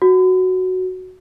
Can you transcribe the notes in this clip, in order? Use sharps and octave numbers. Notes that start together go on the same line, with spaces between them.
F#4